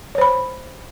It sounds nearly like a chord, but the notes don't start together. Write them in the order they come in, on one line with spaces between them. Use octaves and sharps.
C#5 C5 B5